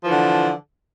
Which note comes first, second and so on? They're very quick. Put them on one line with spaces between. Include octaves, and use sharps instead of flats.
F3 E3 D3